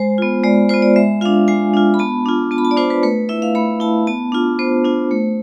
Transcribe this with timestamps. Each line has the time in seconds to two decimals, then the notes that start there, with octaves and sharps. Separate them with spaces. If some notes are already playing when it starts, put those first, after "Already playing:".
Already playing: G#3 C5
0.18 B3 F4
0.43 G#3 D5
0.69 B3 F4 C5
0.82 D5
0.96 G#3 E5
1.21 D4 F4 F5
1.48 G#3 G#5
1.74 D4 F4
1.94 B5
1.99 B3 A5
2.26 D4 F4
2.51 B3 A5
2.58 B5
2.65 A5
2.71 D5
2.77 D4 F4 C5
2.90 B4
3.03 A3 B4
3.29 E4 E5
3.42 F5
3.55 A3 B5
3.80 E4 A5
4.07 B3 A5
4.32 D4 F4
4.59 B3 C5
4.85 D4 F4
5.11 A3